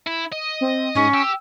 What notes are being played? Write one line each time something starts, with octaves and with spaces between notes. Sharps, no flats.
E4
D#5
C4
G#2 C#4
G4 E6